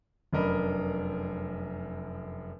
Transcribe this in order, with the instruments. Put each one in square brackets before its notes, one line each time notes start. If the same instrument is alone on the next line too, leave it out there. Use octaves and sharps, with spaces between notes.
[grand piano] F1 F#2 D4 A#4 D#5 B5